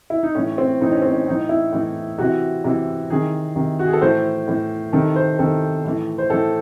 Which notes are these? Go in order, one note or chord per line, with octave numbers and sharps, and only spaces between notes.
E4
D#4
A2 E3 C#4
C4
A2 E3 D#4
C#4
C4
C#4
A2 E3 D#4
E4
A2 E3
C3 E3 F#4
C3 E3
C3 D#3 G#4
C3 D#3
F#4
G#4
A4
A2 E3 C5
A2 E3
C3 D#3 A4
C5
C3 D#3 A4
A2 E3
C5
A2 E3 A4